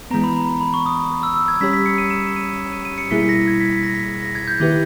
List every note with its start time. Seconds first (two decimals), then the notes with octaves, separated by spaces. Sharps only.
0.11 E3 G#3 B3 A#5
0.24 B5
0.36 A#5
0.49 A#5
0.61 B5
0.74 C#6
0.86 D#6
1.23 E6
1.36 E6
1.48 G#6
1.61 G3 C#4 G4 C#5 B6
1.73 B6
1.86 C#7
1.98 D#7
2.10 E7
2.23 D#7
2.36 D#7
2.73 D#7
2.85 D#7
2.98 C#7
3.11 B2 G3 A#3 E4 G#4 B6
3.23 B6
3.29 A#6
3.48 G#6
3.60 B6
3.73 B6
3.84 A#6
3.95 B6
4.22 A#6
4.35 G#6
4.48 G6
4.60 D#3 A#3 E4 G4 B4